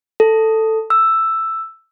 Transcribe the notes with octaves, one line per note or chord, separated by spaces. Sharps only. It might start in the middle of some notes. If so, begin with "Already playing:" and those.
A4
E6